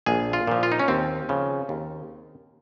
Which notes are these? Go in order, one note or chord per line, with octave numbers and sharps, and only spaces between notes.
A#1 G#4
F4
A#2 F3
F4
D#4
C#4
D#2 C4
C#3 F3
D#2